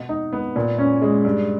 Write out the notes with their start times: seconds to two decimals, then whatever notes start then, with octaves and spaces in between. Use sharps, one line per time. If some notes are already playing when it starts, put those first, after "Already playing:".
Already playing: B2
0.09 D#4
0.33 B3
0.56 A#2
0.78 C#4
1.02 G#3
1.25 G2